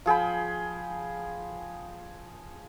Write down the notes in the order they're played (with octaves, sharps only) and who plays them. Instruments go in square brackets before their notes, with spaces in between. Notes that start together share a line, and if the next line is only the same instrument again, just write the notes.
[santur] F3 G#4 G5 B5